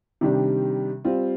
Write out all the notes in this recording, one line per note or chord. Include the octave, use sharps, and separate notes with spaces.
C3 D#3 G3 D4
G3 C4 F4